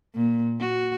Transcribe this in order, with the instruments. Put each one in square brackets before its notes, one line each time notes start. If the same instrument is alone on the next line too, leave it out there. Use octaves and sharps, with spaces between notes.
[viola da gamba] A#2
F#4